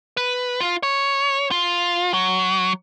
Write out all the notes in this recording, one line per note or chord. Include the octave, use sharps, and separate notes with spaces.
B4
F4
C#5
F4
F#3